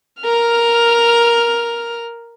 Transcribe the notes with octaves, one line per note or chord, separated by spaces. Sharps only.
A#4 F6